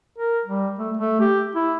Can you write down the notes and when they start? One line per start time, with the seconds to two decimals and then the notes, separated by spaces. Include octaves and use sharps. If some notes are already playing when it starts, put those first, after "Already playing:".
0.18 A#4
0.46 G3
0.79 A3
0.97 A3
1.20 G4
1.55 E4